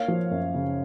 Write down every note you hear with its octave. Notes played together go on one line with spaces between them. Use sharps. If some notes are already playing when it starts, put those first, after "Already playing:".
Already playing: A#3 C#5 F5
F3
F#2
C#3